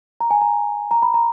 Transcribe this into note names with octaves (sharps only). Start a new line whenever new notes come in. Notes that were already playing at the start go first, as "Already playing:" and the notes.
A#5
G#5
A#5
A#5
B5
A#5